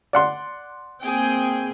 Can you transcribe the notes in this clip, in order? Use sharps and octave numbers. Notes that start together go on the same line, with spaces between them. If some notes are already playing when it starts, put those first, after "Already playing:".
D5 F#5 C6
A#3 C4 G#4 G5